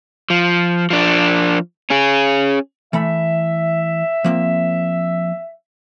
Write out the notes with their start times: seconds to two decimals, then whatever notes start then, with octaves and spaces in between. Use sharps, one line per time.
0.30 F3
0.90 F3 D4
1.90 C#4 G#4
2.93 E3 A3 E5 B5
4.24 F3 A#3 C4